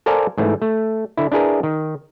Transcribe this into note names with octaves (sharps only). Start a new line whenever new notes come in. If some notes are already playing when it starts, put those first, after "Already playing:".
A4 A#4 C5 D5 F5 G#5
G#2 E3 A3
A3
D3 E4
D4 E4 G#4 A#4 B4
D#3